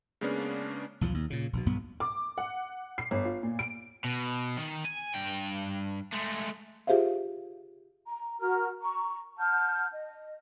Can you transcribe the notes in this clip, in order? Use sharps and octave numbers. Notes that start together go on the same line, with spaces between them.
C#3 G#3 A#3 B3 C#4 D4
B1 E2 D#3 F3
D#2
A#2 C#3
A#1 B2
B1 G2 B2 B3
D6
F#5
C7
G1
F4
A#2
D7
B2
D#3
G#5
G2 G5
G#3 A3
F4 G4 G#4 C5 E5 F5
A#5
F#4 A#4 A#5 F6
A#5 C#6
F#5 A5 F6 G6
D#5